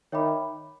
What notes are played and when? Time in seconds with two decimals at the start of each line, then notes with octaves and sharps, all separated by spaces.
0.12 D#3 C#5 E5 G5 B5 D6